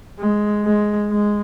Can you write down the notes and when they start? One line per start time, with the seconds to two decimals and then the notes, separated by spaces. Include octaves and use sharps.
0.19 G#3
0.65 G#3
1.11 G#3